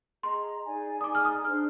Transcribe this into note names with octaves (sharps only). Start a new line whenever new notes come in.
G#4 D#5 A#5 C6
D#4 G#4 D5 G#5
D#6
D#4 G#4 D5 G#5 D6
F6
D#6
D4 G#4 C5 F6